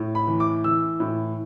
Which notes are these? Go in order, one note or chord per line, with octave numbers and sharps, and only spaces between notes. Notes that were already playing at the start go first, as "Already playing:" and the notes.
Already playing: A2
B5
E3
D6
E3 E6
A2